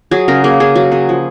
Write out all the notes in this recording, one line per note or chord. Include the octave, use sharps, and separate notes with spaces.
F#3 G#4
C#3 A#4
A#3 G#4
C#3 G#4
F#3 F#4
C#3 G#4
F3